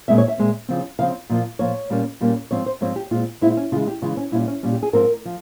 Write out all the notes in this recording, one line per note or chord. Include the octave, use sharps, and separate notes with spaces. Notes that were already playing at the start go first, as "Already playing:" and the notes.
A#2 G#3 C4 E5
C#5
E5
A#2 G#3 C4
C#3 F3 C4
C#3 F3 C4 F5
A#2 F3 A#3
A#2 F3 A#3 C#5
A#2 G3 A#3 C#4
A#2 G3 A#3 C#4
G#2 F3 C4 C#5
C5
G#2 F3 C4 C#5
G4
A#2 G#3 C4 F4
A#2 G#3 C4 E4
C#4
C#3 E3 G#3 F4
G4
C#3 E3 G#3 F4
C#4
A#2 G3 C#4 E4
C#4
A#2 G3 C#4
G4
G#4
G#2 F3 C4 A#4
F3